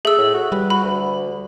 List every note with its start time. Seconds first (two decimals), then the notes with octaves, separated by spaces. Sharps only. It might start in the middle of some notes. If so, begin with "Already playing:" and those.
0.05 A3 G#4 E6
0.18 A2
0.34 F#4
0.52 G3 B4
0.70 F#4 B5
0.83 D2